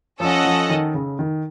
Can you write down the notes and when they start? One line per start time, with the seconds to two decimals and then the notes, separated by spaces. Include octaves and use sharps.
0.19 F3 C#4 A4 D#5 F#5
0.45 F3
0.69 D#3
0.94 C#3
1.19 D#3